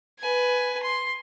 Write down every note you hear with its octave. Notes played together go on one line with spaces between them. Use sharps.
B4 G#5
C6